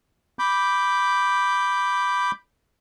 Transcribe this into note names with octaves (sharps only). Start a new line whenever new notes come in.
B5 D6 G6